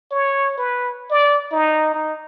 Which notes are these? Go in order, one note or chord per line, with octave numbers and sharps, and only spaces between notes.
C#5
B4
D5
D#4
D#4